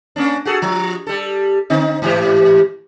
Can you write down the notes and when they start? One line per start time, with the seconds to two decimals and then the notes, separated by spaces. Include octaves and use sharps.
0.16 A#3 C#4 D4
0.45 F#4 G#4 A4
0.62 F3
1.07 G3 A4
1.70 D3 C4 D#4
2.02 G#2 E3 G4